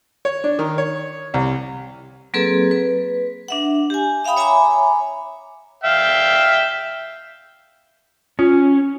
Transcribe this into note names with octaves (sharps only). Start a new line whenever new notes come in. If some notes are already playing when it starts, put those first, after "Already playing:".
C#5
D4
D#3
C#5
C2
F#3 A#3 C4 G#4 A4 B4
B4
D4 E5 F#5
G4 G#5
E5 F5 G5 B5 D#6
C#5 E5 G#5 A#5 B5 D6
E5 F5 G5
C#4 F4